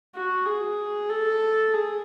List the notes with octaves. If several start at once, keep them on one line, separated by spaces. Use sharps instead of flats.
F#4
G#4
A4
G#4